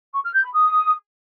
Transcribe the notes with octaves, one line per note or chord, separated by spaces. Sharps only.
C#6
F6
G6
B5
D#6